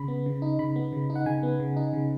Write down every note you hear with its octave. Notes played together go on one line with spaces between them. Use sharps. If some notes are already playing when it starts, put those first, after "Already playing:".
Already playing: C#3 B5
B3
C#3
D#4
C#3 B5
B3
C#3
D#4
F#5
C#3 G#5
B3
C#3
D#4
C#3